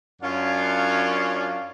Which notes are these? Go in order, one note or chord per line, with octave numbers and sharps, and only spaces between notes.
F#2 C#4 D4 F4 C#5 F5